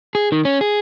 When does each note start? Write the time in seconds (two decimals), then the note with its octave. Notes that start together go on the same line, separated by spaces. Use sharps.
0.15 G#4
0.32 D#3
0.45 C#4
0.61 G#4